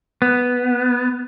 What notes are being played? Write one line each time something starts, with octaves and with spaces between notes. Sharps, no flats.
B3